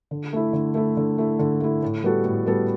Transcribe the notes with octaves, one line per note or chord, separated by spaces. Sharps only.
D3
A3 E4
D3
A3 E4
D3
A3 E4
D3
A3 E4
A2
G3 B3 F#4 A4
A2
G3 B3 F#4 A4